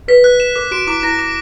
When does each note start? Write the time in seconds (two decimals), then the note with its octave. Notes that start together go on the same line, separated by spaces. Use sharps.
0.08 B4 B6
0.24 F#6
0.40 E7
0.56 A#4 D6
0.71 F#4 D7
0.87 E4 D6
1.03 E4 A#6
1.19 D6